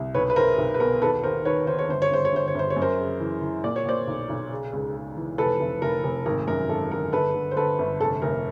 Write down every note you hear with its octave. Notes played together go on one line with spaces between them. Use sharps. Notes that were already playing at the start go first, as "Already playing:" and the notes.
Already playing: C2
B1 B4 C#5
B4
B1 A#4 C5
B1
B4
B2 A#4
D#2 A4 B4
D#2 A#4 C5
D#3 B4 C#5
D#3 C5
C#5
G1 C5
C#5
G1 C5
C#5
G1 C5
C#5
G1 C5
C#5
F#2
A#4 C5
C#3
E3
E3
A#2 D5
C#5
A#2 C5 D5
B1
B1
C#3
C#2
C#3
E3
F1 A4 B4
F1
F1 A#4
F1
G#1 A#4
F#2 A#4
G#1 A4
D3 A#4
G1 A4 B4
D3
C5
D3 A4 B4
G1
F1 A4
F1 A#4